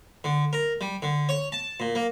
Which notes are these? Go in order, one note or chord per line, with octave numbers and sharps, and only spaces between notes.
D3
A#4
G3
D3
C#5
A5
A#2
A#3